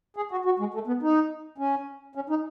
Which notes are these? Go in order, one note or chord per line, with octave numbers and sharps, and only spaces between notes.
G#4
F#4
F#4
G#3
A3
B3
D#4
C#4
C#4
D#4